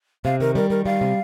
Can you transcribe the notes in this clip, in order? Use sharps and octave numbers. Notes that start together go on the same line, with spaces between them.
C3 F5
D#3 A#4
G3 A#4
D#3 A#4
G3 F5
C3